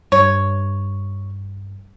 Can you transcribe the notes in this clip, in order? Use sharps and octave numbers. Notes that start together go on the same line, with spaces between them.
G2 C#5